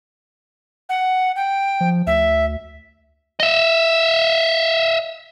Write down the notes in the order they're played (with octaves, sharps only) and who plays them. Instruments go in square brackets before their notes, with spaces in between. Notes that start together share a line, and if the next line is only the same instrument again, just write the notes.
[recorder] F#5
G5
[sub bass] F3
[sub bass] D2 [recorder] E5
[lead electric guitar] D#5 E5